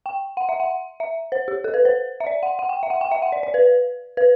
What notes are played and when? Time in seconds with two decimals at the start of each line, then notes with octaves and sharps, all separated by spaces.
0.06 G5
0.37 F#5
0.49 E5
0.60 F#5
1.00 E5
1.32 C5
1.48 G4
1.64 A4
1.74 B4
1.85 C5
2.20 E5
2.27 D5
2.43 F#5
2.59 F#5
2.69 G5
2.83 E5
2.90 F#5
3.01 G5
3.12 E5
3.22 F#5
3.32 D5
3.43 D5
3.54 B4
4.17 B4